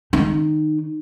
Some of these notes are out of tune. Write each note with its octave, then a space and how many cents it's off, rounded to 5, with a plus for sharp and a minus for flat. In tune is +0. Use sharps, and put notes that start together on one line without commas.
D#3 -15 D#4 -20